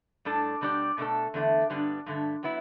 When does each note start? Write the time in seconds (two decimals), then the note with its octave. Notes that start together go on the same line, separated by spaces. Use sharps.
0.25 A2 G3 D4 A4
0.61 B2 G3 D4 G4 D5
0.98 B2 A3 D4 A4
1.34 E2 D3 A3
1.70 G2 D3 G3 B3 D4
2.06 G2 D3 A3
2.43 F#3 B3 E4